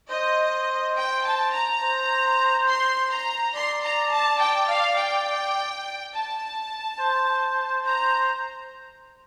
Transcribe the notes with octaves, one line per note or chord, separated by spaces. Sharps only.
C5 D#5
G5
A5
A#5
C5
C6
A#5
D5 C6
A#5
A5
G5
F5
G5
A5
C5
A#5